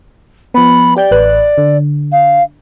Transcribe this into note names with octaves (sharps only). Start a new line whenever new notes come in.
F3 B3 B5
G4 D5 G5 G6
A1 B4 F#6
D3
F5